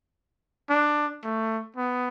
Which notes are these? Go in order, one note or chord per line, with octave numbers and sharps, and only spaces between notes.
D4
A3
B3